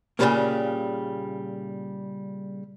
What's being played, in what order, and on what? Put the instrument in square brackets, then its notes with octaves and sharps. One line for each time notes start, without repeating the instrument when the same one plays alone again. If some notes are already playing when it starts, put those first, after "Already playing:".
[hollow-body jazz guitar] A#2 C#3 E3 G3 A3 A#3